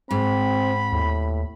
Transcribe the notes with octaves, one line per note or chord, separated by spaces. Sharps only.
G#2 C4 B5
D#2 A2